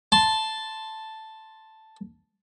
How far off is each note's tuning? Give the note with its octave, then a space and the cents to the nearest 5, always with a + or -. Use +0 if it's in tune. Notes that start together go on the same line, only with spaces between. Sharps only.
A5 +0 C6 +0